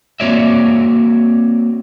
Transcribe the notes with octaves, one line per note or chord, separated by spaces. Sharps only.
A#3 C4 F#4 C#5 D5 E5